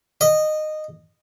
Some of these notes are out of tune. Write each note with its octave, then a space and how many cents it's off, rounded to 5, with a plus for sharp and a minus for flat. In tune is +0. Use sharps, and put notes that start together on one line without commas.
D#5 -15